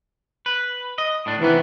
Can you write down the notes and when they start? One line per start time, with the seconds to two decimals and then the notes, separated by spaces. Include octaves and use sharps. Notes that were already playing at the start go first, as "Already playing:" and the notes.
0.46 B4
0.98 D#5
1.26 A2 D4
1.40 C3 D#3 E3 B3